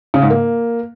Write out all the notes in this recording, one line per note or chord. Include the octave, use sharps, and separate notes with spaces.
C#3
G#2
A#3